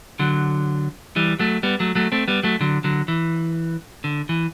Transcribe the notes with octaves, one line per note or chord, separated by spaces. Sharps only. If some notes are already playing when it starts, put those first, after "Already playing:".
D3 F#3
E3 G3
F#3 A3
G3 B3
F#3 A3
F#3 A3
A3 C4
G3 B3
F#3 A3
D3 F#3
D3 F#3
E3
D3
E3